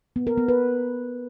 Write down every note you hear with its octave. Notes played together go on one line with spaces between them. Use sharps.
B3
A#4
B3
B4